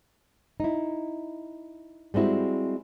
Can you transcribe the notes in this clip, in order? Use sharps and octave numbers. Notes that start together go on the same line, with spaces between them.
D#4 E4
G3 G#3 C4 E4 F#4